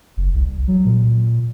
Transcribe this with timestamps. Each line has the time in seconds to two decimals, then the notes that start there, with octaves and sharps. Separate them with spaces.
0.17 F#1
0.34 C2
0.68 F#3
0.85 A#2